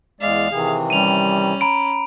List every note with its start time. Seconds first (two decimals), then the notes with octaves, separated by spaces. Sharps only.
0.21 E2 G#3 D5 F5
0.52 C3 D#3 E3 G#4
0.90 G3 C#4 D#7 F7
1.61 A#5 B5 D7